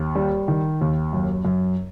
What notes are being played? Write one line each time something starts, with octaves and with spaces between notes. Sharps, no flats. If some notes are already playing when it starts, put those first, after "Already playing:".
Already playing: D#2
G3
D#3
D#2
F#2
F#2